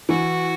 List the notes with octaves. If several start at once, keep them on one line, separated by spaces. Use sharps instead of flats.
E3 F#4